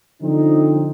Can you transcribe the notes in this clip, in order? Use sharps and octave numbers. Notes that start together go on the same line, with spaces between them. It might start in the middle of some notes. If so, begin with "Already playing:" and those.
D3 F3 C4 D#4